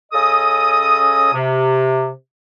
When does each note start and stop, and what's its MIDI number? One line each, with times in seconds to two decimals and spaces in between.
0.12 1.31 49
0.12 1.31 61
0.12 1.31 69
0.12 1.31 75
0.12 1.31 87
1.33 2.09 48